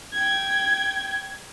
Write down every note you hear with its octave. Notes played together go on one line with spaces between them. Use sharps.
G5 G#6